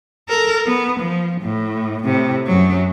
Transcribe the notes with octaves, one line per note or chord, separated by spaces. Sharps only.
A4 A#4
B3
F3
A2
A2 C3
F#2 F#3